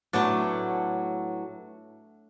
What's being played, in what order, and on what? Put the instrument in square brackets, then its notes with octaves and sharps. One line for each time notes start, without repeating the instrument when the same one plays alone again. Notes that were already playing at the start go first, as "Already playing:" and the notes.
[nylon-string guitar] A2 F#3 B3 [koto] A3 D4